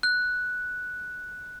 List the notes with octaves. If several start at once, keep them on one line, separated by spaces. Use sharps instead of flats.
F#6